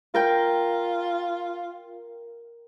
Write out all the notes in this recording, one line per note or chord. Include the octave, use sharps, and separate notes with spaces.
F4 A#4 G5